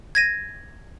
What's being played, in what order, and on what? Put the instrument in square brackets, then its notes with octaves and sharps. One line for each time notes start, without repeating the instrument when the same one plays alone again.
[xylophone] G#6 A#6 D#7